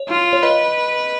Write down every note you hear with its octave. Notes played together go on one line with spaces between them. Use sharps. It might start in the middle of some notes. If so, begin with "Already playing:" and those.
Already playing: C#5
F4
C#5
B4 D#5